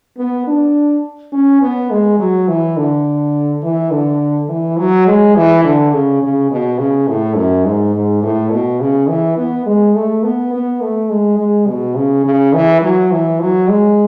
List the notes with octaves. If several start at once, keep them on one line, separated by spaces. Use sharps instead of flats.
B3
D4
C#4
B3
G#3
F#3
E3
D3
E3
D3
E3
F#3
G#3
E3
D3
C#3
C#3
B2
C#3
A2
F#2
G#2
G#2
A2
B2
C#3
E3
B3
G#3
A3
B3
B3
A3
G#3
G#3
B2
C#3
C#3
E3
F#3
E3
F#3
G#3